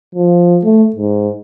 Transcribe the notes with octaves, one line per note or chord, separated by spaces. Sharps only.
F3
A3
G#2